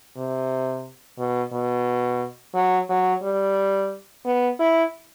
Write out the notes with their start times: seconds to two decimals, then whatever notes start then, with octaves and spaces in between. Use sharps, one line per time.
0.16 C3
1.19 B2
1.52 B2
2.54 F#3
2.89 F#3
3.23 G3
4.25 B3
4.60 E4